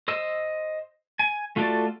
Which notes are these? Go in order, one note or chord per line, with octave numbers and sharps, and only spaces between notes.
C5 D#5 E6
G#5
A3 F4 F#4 A4 D5